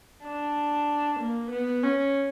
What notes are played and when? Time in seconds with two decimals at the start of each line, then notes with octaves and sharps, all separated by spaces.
0.24 D4
1.20 A#3
1.51 B3
1.83 C#4